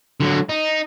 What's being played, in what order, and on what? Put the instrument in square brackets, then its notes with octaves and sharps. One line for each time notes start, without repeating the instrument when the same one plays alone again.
[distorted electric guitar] D3 F#3
D#4